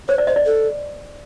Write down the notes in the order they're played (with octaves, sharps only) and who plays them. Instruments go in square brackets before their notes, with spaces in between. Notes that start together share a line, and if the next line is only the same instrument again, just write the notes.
[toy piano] C5 [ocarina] C#5
[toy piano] D5
[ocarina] C5 [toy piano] D#5
[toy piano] D5
[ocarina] A4